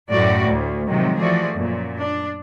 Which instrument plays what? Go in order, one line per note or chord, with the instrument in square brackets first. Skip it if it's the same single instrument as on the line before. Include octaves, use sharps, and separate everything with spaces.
[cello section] F#2 A2 F#4 D5
D2
A2 C3 D#3 F3 F#3 G#3
E3 F3 A3 F#4 G#4 D5
F#2 A#2
D4